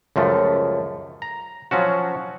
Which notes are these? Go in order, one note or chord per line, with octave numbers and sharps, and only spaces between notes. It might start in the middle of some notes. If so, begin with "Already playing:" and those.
C#2 F#2 F3 A3
A#5
F3 F#3 C#4 F#4